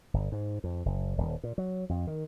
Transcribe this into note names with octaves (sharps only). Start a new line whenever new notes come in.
G1
G#2
F2
F#1
D#1
A#2
F#3
F2
D#3